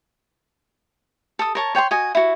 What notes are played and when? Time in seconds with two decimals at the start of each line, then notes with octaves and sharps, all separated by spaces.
1.39 A4 D#6
1.55 A#4 C#5 A5
1.75 C#5 G5 G#5 C6
1.91 F#4 D#5 G#5
2.15 E4 F#4